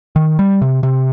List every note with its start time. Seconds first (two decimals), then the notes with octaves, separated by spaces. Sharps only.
0.16 D#3
0.39 G3
0.62 C3
0.83 C3